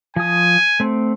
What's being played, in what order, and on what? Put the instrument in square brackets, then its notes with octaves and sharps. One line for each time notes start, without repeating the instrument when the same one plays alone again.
[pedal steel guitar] F3 D#6 [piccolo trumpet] G#5
[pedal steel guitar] A3 C4